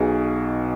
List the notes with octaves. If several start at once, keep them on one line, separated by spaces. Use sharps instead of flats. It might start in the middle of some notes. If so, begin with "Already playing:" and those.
Already playing: B1 B2 G#4